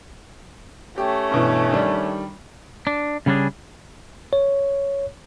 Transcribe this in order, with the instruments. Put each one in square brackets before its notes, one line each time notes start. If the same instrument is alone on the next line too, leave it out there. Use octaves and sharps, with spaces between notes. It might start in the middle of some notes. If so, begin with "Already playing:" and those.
[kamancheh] A3 C#4 [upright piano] G4
[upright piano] G2 B2 E3
D#3 G3 D4
[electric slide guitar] D4
C#3 G3 C#4 D4 G#4
[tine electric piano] C#5